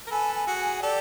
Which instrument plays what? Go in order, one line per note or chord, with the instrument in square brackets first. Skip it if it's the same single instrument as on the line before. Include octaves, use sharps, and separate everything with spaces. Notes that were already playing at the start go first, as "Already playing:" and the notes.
[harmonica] A#4
[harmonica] A4 B4 [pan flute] G#5
[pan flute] G#5
[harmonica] F#4 G#4
[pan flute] G#5
[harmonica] G4 A4 [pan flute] D5